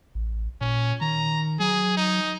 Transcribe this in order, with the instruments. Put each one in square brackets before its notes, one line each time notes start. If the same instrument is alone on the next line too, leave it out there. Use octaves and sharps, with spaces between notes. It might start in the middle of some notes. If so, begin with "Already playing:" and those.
[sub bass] A1
[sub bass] A#2 [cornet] C#4
[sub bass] D#3 [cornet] A#5
[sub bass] F#3 [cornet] G#4
[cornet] D#4